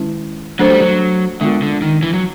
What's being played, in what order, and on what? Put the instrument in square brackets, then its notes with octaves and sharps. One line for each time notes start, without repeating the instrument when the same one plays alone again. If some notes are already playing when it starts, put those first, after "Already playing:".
Already playing: [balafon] D#3 G#3 C#4 E4
[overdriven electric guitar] F#3 [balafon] A3 D4 F#4 A4 C5
[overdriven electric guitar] G3
F#3
[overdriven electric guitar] D3 [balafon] G#3 B3 D4 F4 A#4
[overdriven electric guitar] D3
D#3
E3
F#3